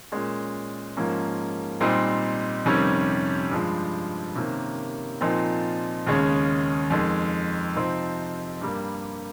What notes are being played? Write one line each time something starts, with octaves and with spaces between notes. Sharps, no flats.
A#2 G#3 C#4
G#2 F3 A#3 C#4
A#2 G3 C4 D#4
F2 C3 D#3 G3 C#4
G2 F3 G#3
C3 D#3 A#3 C#4
A#2 F3 C4 D#4
D#2 C#3 G#3 C#4
F2 D#3 G#3
C3 F3 C4 D#4
G2 G3 A#3